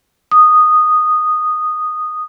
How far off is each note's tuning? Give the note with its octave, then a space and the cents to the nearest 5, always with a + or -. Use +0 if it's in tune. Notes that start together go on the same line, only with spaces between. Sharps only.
D#6 -10